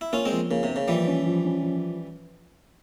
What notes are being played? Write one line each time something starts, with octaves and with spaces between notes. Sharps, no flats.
E4
A#3 C#4 F4
G#3 C4
F3
C#3 A#3
C3
A#3
C#3
E3 F3 G3
C#4
F3
C#4
F3